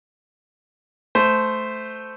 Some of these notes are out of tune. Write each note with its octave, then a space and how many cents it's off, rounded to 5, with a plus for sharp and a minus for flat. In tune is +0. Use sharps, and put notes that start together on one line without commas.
A3 -10 C5 -15